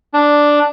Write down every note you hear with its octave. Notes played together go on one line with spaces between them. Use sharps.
D4